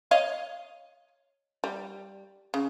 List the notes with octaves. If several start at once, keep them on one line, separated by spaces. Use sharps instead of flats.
C#5 D#5 F5
G3
C#3